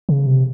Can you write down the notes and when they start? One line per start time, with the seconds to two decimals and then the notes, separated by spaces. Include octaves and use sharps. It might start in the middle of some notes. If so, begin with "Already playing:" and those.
0.09 C#3
0.27 C3